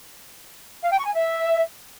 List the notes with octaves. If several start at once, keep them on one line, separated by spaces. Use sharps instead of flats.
F5
G5
C#6
G#5
E5